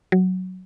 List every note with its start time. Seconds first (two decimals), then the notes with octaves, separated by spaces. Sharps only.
0.12 F#3